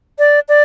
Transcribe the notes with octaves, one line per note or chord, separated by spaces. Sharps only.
D5
D5